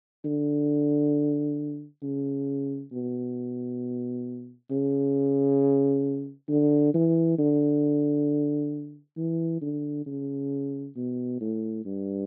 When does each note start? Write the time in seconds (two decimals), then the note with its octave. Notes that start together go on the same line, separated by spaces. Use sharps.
0.25 D3
2.03 C#3
2.92 B2
4.71 C#3
6.49 D3
6.94 E3
7.38 D3
9.17 E3
9.62 D3
10.06 C#3
10.96 B2
11.41 A2
11.85 G2